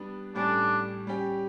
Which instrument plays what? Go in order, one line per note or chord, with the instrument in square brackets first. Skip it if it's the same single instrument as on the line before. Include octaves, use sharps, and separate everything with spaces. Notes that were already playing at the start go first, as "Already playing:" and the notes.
Already playing: [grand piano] G3 B3 D4
[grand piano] A2 G3 C#4 [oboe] D4
[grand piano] G3 C#4 G4